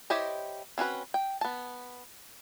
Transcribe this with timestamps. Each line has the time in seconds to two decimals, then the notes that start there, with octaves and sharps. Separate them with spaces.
0.10 E4 G4 C5 C#5 D#5
0.78 C4 C#4 F#4 B4
1.14 G5
1.41 B3 A5